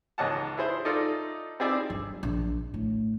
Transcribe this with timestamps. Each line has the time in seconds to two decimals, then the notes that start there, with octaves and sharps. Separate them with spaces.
0.18 C#2 G#2 C#4 D#5 F#5 A5
0.57 E4 G#4 C5
0.85 D#4 F4 A4 D5 D#5
1.60 C4 D#4 E4 G#4 D5 E5
1.90 G1
2.23 A#1
2.74 A2